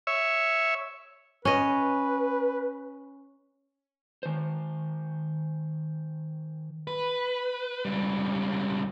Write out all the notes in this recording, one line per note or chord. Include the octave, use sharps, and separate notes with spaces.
C#5 E5
C#4 B4 D#5
D#3 C5
B4
C#2 G3